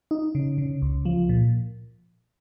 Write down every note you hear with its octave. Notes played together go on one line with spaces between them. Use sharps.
D#4
C#3
C#3
C#2
F3
A#2